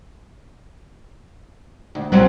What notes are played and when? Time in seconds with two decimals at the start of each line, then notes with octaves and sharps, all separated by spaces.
1.95 D2
2.12 C2 F#3 C4 C#4